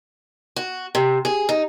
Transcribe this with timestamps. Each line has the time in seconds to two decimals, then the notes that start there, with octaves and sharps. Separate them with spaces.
0.56 F#4
0.95 C3
1.25 G#4
1.49 D#4